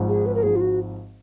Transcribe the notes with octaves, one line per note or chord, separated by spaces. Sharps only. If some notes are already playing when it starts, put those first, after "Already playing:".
Already playing: G#1 G#2 F3
G#4
B4
A#4
G#1 G#2 F3 G#4
F4
F#4